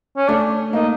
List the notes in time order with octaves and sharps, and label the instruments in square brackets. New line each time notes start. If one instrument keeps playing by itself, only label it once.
[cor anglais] C#4
[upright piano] A3 [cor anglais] D4
[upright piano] A#3 [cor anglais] D#4